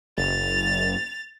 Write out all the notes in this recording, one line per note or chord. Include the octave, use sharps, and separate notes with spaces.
F#1 A6 F7